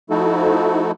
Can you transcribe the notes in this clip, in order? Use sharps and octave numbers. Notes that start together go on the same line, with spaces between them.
F3 A3 D#4 E4 F#4 A4